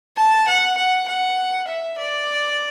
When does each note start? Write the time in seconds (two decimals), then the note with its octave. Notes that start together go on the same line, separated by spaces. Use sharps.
0.17 A5
0.48 F#5
0.77 F#5
1.07 F#5
1.67 E5
1.98 D5